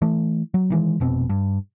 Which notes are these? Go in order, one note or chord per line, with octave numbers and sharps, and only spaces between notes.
E3 A3
F#3
D#3 E3 G#3
F1 B2 C4
G2